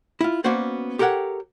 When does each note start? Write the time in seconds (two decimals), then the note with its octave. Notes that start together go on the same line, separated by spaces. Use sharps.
0.21 E4 F4
0.44 A#3 B3 C#4 F#4 C5 D5
0.99 G4 A4 A#4 C#5 F#5 G5